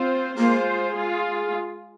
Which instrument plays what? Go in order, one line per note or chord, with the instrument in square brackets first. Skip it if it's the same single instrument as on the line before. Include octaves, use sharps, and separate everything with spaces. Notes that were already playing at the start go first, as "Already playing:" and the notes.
Already playing: [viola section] C4 F4 C5
[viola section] G#3 F4 C5 [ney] A#3
[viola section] G#3 F4 G#4